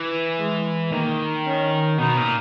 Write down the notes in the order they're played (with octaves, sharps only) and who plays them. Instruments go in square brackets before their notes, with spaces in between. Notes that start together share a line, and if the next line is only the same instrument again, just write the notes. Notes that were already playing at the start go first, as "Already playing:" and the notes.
Already playing: [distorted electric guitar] E3
[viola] G#3
[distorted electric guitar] D#3 [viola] A#3
[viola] C#4
[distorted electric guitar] B2 [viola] D#4
[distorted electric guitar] A#2